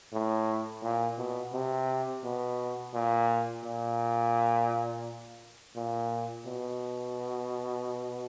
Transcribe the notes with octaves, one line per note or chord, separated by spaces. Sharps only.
A2
A#2
B2
C3
B2
A#2
A#2
A#2
B2